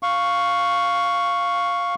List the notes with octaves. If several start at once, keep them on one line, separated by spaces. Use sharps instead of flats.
F5 C#6